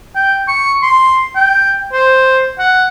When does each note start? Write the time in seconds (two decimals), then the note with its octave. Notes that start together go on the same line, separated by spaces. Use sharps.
0.15 G5
0.48 C#6
0.82 C6
1.36 G5
1.93 C5
2.59 F#5